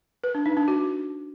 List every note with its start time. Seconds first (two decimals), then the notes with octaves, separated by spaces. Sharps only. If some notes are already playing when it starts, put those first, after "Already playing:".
0.24 B4
0.35 D4
0.46 D#4
0.57 D4
0.68 F#4